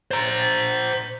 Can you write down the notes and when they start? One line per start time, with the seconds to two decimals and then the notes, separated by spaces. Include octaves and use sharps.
0.11 C5 A#5